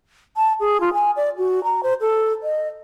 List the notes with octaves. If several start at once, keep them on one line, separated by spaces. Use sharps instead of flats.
A5
G#4
F4
G#5
D5
F#4
A#5
C5
A4
D#5